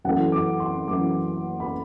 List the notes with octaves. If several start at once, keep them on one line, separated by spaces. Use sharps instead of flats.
F#2 E3 A3 F#5
D6
C6
F#2 E3 A3 D6
B5